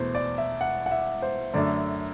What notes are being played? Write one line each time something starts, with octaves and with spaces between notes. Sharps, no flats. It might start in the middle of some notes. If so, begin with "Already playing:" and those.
Already playing: E2 B2 A3 C5
D5
E5
F#5
F#5
E5
C5
F#2 D3 A3 D4 D5